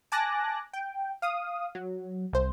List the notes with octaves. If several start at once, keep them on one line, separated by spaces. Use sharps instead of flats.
G#5 A5 D6 F#6 A#6
G5
F5 D#6
F#3
C2 C5